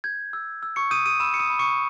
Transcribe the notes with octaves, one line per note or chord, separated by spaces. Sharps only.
G6 G#6
E6
E6
C#6 C#7
D#6 G6 D#7
D#6 D#7
B5 E6 E7
C#7
D#6 D#7
B5
C#6 C#7